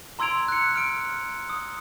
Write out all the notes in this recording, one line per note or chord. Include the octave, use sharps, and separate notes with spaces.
A#5 C6 E6 G#6 D7 F7
F#6 C#7
F6 D7
D#6